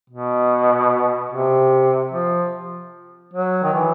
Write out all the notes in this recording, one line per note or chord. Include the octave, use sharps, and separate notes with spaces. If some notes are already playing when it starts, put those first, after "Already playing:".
B2
C3
F3
F#3
D#3
E3